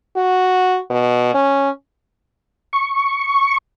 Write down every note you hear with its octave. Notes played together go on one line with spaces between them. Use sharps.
F#4
B2
C#4
C#6